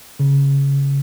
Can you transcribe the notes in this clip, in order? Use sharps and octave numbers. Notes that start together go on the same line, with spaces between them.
C#3